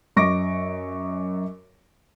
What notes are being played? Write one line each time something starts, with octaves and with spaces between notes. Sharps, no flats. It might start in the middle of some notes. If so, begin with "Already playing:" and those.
F#2 D#5 C#6 D6 A#6 D7